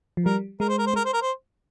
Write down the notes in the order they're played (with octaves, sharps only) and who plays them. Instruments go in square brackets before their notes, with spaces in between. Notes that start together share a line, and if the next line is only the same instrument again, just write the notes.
[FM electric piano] F3
[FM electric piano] G3 [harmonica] A#4
[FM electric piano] G#3 [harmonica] A#4
[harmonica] C5
A#4
C5
[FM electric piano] G#3 [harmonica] A#4
[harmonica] C5
A#4
C5